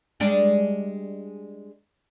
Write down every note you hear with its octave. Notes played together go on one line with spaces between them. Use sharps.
G3 G#3 D4